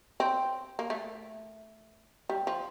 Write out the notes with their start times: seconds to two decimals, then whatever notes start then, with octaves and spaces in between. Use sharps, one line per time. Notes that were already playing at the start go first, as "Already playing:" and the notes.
0.20 C4
0.79 A#3
0.90 A3
2.29 G3
2.47 F3